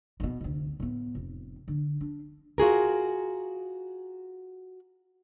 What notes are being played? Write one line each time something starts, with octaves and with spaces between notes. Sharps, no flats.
B2 D3
F1 D2
A2 B3
F1
D3
D4
F4 F#4 G#4 A#4